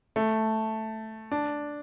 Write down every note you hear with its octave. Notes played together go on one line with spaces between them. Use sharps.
A3
D4